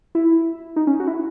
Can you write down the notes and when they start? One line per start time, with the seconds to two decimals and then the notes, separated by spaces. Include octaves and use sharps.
0.15 E4
0.76 D#4
0.87 C#4
1.00 F#4
1.07 E4